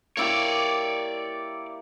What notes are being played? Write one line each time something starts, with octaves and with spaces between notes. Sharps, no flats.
A#3 E4 G4 C#5 D5